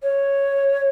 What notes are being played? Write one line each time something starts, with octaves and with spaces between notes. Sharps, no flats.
C#5